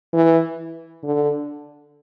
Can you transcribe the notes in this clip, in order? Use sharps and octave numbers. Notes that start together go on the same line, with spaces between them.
E3
D3